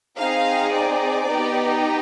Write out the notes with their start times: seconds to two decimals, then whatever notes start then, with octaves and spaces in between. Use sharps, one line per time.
0.17 C4 D#4 G#4 F5
0.72 D5
1.29 B3 D#4 G4